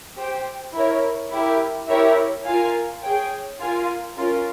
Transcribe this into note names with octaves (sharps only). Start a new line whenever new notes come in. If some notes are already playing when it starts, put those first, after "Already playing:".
G4 C5 G5
E4 A#4 C#5
E4 G4 A#4
E4 G4 A#4 C#5 E5
F4 A#4 F5 G#5
G#4 C#5 G5
F4 A#4 F5 G#5
C#4 F4 A#4